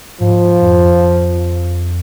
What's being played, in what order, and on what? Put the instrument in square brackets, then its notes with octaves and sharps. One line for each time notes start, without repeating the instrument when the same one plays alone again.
[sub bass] G#2 [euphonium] F3
[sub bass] F2